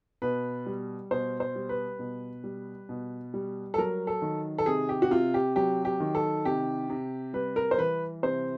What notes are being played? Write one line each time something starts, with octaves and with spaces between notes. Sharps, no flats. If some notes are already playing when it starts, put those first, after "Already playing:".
B2 B4
G3
B2 C5
C5
G3
B4
B2
G3
B2
G3
A4
F#3 A#4
A4
D#3
A4
C3 G#4
G4
F#4
C3 F4
G4
F#3 G4
G4
D#3
A4
C3 G4
C3
G3 B4
A#4
C5
E3 B4
C3 C5